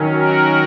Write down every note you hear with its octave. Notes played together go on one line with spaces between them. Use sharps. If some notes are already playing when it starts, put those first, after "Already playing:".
Already playing: D#3 F#3 C#4
F#4 A#4